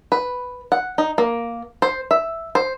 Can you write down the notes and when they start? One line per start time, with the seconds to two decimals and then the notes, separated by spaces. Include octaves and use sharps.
0.12 B4
0.72 F#5
0.98 D#4
1.18 A#3
1.82 C5
2.11 E5
2.55 C5